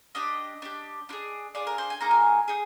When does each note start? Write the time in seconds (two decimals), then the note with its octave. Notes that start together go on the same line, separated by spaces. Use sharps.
0.15 D4 G4 D#5
0.62 D4 G4
1.09 D4 F4 G#4
1.55 D4 F4 G#4 D5
1.67 A#4
1.78 C5
1.90 G#5
2.01 A#3 D#4 G#4 A#5
2.11 G#5
2.48 D#4 G#4